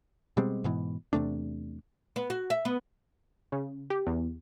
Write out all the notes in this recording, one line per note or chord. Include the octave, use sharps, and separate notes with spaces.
B2 G3 G#3 C4
G#2 B2 E3
E2 C3 A3 D4
B3
F#4
E5
B3
C#3
G4
E2